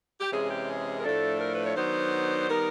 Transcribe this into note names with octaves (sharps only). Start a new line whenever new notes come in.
G4
C3 E3 G#3 C#4 G#4
G4
G#4
A#4
A2 F3 A3 D4 A4
A#4
B4
C#5
D#3 F#3 B3 D4 C5
D#3 G3 B3 A#4